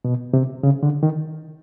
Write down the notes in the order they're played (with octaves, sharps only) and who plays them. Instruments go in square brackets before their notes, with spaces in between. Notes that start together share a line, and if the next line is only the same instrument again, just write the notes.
[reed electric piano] B2
C3
C#3
D3
D#3